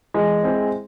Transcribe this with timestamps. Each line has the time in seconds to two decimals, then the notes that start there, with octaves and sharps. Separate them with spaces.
0.14 E3 G#3
0.44 C4 E4 G#4 C5